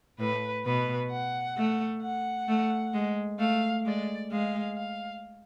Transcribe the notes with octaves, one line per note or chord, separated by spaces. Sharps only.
A2 B4
B2 B4
F#5
A3
F#5
A3
G#3
A3 F5
G#3 D5
G#3 F5
F5